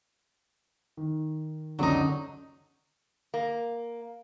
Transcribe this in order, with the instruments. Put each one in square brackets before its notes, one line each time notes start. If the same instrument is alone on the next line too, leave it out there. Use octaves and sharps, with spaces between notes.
[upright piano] D#3
[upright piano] C#2 F#2 [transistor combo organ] D3 [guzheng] F#3 D#4
[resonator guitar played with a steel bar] A#3